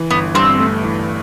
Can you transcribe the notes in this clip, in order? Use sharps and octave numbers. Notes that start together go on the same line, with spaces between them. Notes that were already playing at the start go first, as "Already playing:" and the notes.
Already playing: E3
G1 B3
G2 C4
A3
E3